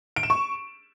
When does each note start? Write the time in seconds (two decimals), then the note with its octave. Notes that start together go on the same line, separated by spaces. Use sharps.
0.16 D7
0.23 E7
0.30 C#6